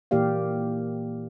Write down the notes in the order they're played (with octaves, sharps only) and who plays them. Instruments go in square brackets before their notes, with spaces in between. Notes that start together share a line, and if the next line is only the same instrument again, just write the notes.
[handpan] A#2 E3 A#3 G4 D5 F5